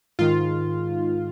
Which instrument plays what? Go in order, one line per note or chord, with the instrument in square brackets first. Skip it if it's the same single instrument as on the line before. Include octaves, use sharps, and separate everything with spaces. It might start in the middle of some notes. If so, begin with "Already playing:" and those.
[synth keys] G#2 D#3 F4